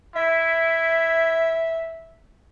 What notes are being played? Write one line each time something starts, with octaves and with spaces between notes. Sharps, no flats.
E4 E5